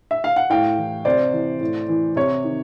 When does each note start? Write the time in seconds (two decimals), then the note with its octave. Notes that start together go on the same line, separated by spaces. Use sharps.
0.11 E5
0.24 F5
0.36 F#5
0.50 A2 F5 G5
0.78 E3
1.05 C3 C5 D5
1.33 E3
1.61 A2
1.89 E3
2.16 C3 C#5
2.44 D#3